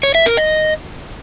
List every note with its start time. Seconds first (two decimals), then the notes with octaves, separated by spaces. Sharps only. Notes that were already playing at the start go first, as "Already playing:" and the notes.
0.03 C#5
0.15 E5
0.26 A#4
0.37 D#5